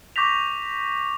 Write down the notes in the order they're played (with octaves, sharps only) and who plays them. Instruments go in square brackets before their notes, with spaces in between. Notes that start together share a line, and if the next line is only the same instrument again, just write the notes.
[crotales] C#6 D6 G6 A#6 B6 F7